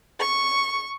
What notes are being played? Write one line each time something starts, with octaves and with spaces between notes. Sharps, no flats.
C#6